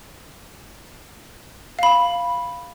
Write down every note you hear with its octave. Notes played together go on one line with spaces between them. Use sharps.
F5 B5